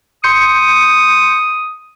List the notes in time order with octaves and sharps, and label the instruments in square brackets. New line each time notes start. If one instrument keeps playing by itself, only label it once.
[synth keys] C6 G6 C#7 [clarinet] D#6